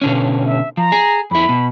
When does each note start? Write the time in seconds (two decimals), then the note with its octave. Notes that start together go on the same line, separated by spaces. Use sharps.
0.02 B2 D3 C#4
0.46 E5
0.77 F3 A#5
0.92 G#4
1.31 F2 E4 B5
1.49 B2